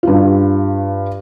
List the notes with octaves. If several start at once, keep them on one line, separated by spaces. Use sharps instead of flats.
G2 F4